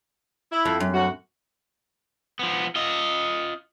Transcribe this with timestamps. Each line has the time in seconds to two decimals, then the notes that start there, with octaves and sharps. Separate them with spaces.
0.51 E4
0.65 F2
0.80 F#2
0.94 D2 C#4 F#4
2.39 F3 B3
2.75 F4 D#5